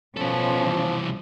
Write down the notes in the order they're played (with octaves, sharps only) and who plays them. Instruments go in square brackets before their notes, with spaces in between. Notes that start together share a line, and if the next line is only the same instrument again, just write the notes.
[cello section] B2 C#4 F4 [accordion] F3 [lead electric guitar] B3 A4
[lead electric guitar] C2 E3